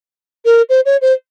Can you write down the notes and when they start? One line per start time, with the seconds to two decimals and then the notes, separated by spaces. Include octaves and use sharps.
0.45 A#4
0.69 C5
0.86 C#5
1.02 C5